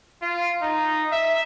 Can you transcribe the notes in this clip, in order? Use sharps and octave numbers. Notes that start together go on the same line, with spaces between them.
F4
D#4
E5